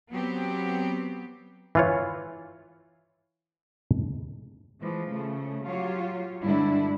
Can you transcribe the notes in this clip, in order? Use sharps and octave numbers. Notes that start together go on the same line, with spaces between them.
F#3 B3 C4 G4
E3 F4 C#5
E3 F3 G#3
C#3 A3
F#3 F4 G4 C#5
G2 D3 G3 G#3 D4 E4